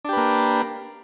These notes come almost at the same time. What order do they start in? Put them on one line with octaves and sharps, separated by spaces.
D4 G4 B4 A#3